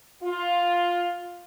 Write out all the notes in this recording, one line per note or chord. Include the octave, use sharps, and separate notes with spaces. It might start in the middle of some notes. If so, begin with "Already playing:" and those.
F4